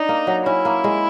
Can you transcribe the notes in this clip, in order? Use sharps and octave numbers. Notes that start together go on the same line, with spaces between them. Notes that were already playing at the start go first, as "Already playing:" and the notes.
Already playing: D4 D#4
A#3
F#3
C#4 E4
A#3
G#3